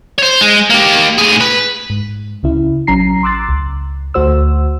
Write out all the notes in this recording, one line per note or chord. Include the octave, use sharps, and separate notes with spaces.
C5 C#5
G#3
A#3 G4
A2 G#4
B4
G#2
C#2 C#3 E4
A1 F#3 C#4 A#5 C7
C6 D6 E6 F#6 A6
C#2
D2 A3 F#4 C5 E6